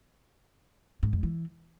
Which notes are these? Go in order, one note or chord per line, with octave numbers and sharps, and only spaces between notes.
G#2
F2
E3